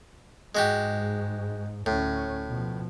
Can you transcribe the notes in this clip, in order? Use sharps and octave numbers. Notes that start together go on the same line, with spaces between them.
G#2 G#3 F#4 G4
D2 A2 C#4
B2 F3